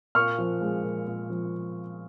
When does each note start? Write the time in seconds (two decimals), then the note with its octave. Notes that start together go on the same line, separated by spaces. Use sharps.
0.15 A#2 C#6 F6
0.38 F3
0.61 G#3
0.83 A#2
1.07 A#2
1.30 F3